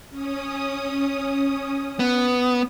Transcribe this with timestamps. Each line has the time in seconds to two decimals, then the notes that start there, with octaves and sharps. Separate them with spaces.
0.10 C#4 D#6
1.99 B3